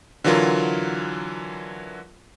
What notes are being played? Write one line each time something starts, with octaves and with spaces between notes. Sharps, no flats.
D3 E3 F#3 F4 A#4